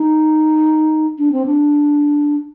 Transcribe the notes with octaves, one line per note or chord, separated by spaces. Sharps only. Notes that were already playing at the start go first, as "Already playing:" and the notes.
Already playing: D#4
D4
C4
D4